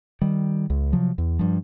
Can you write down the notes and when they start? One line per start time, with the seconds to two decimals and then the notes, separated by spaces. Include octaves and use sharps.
0.21 D#3 G3
0.70 C#2
0.93 C3 F3 F#3
1.18 E2
1.39 G2 F3